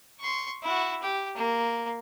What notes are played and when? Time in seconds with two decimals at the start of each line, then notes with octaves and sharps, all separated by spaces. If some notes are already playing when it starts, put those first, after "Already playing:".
0.20 C6 C#6
0.63 E4 F#4
1.02 G4
1.36 A#3